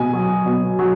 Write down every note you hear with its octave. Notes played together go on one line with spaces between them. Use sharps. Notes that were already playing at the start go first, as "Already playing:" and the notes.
Already playing: B2 G#5
F#3
B2
F#3